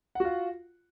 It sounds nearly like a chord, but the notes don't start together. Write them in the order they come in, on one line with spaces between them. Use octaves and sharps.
F#5 F#4 F4